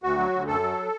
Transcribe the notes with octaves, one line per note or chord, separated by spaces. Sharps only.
D2 F#4
F#3
D2
F#2 A4
F#3